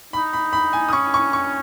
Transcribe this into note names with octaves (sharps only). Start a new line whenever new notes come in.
D#4 B5
B5
B5
G#5
D#6
C#4 C#6
C#6
C#6